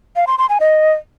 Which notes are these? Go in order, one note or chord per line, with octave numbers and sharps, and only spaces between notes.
F5
C6
C6
G#5
D#5